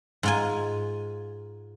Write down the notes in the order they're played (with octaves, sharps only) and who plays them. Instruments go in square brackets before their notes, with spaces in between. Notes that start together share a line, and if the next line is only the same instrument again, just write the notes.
[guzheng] G#2 F4 G#5